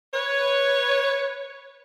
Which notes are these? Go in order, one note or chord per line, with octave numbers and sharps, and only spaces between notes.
B4 C#5